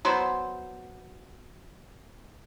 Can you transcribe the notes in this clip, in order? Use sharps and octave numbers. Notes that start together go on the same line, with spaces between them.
F#3 B3 C5